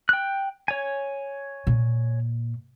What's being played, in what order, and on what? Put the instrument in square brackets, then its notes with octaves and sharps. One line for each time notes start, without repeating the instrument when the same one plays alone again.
[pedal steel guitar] G5 F#6
C#5 G#5
[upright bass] A#2